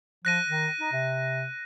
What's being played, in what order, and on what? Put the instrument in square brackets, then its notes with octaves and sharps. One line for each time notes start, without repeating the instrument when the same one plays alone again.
[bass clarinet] F3 [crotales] F#6 A#6 D#7
[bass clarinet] D#3
D#4
C3